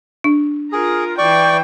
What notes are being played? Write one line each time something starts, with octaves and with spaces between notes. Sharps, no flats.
D4
F4 G#4 A#4
E3 D5 G5 C#6